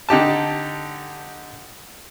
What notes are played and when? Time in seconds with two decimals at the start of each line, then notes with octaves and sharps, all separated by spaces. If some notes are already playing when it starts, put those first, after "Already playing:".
0.09 D3 D#4 G4 A5